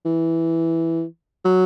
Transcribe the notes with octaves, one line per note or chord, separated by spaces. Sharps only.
E3
F#3